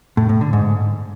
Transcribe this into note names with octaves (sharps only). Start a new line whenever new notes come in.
A2
A2
D3
G#2